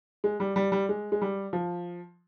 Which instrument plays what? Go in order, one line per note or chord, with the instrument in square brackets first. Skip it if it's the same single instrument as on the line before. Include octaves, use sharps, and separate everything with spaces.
[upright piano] G#3
G3
G3
G3
G#3
G#3
G3
F3